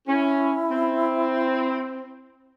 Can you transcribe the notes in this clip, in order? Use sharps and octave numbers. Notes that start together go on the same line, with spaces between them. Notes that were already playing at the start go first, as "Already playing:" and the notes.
C#4 E4
C4